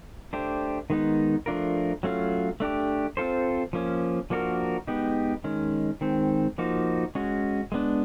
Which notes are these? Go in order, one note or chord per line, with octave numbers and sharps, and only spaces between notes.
A3 D4 G4 C5
D#3 G#3 B3 D#4
F3 A3 D4 F4 A#4
F#3 A3 C#4 F4
A3 D4 G4
C4 F4 A4 C5
F3 A#3 C#4
F3 A#3 D4 F#4 A#4
G#3 B3 D#4 G4
D#3 G#3 C#4
D#3 G#3 C4
F3 A#3 D#4 F#4
G#3 C#4 F#4
G#3 B3 D4